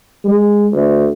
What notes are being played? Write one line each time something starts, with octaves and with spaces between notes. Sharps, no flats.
G#3
D2